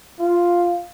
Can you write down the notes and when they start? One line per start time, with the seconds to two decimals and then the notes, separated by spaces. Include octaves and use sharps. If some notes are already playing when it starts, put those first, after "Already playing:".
0.20 F4